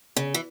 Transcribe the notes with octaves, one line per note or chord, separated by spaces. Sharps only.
C#3
E3